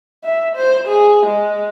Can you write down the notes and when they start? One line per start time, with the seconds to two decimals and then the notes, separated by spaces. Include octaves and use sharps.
0.24 E5
0.56 C5
0.88 G#4
1.26 G#3